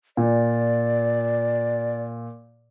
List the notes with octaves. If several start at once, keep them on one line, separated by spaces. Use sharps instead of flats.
A#2 D5